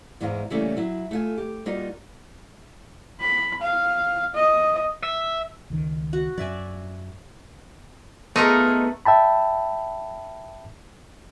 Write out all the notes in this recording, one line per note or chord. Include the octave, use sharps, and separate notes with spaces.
E2 G#2 G#3 E4 F5 A#5
C#3 E3 G3 A3 A#3 C#4
F#3 E4
A3 F4 G#5
G4
G3 A#3 D#4 F4 F#4
B5
F5
D#5
E5
C#2 D#3
F#4
F#2 F#3 D5 E5 G#5
A3 B3 D#4 F4 G#4 A#4
E5 G5 A5 B5